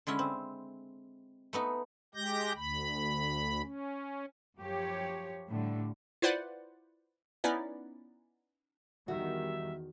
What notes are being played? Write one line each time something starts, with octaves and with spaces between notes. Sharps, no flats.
D3 G#3 C#4 E4
C4
A3 B3 D#4
G#3 G4 G6 A#6
D2 B5
C#4
F#2 F3 G4 C#5
A2 D3 G3
E4 F4 B4 C5 D5 F#5
B3 C#4 D#4 E4 B4 D5
E2 D#3 G3 F#4 E5